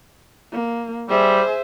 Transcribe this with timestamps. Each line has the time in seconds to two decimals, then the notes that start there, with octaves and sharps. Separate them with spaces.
0.52 A#3
1.09 G3 G#4 C5 E5